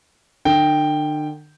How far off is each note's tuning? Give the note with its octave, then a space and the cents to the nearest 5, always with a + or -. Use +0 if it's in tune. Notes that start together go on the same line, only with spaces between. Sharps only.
D3 +40 G5 +0